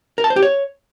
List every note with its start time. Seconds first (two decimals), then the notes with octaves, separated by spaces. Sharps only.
0.18 A#4
0.24 A5
0.30 C5
0.36 G4
0.43 C#5